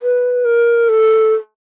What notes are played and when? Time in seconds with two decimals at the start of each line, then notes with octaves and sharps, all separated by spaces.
0.03 B4
0.45 A#4
0.89 A4